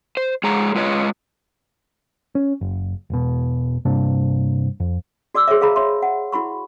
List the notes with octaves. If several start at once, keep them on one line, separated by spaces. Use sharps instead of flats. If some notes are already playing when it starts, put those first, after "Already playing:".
C5
G#3 G#4 C#5 A#5
G#3 F4 B4 C#5 D#5
C#4
F#1
E1 B2
G2 C3 A#3 D4
F2
F#4 D5 D6 E6
F#4 G#4 C5 C#5 E5
G#4 F5 A#5 B5
C#5 E5 C6
F#5
E4 F#4 B5 C#6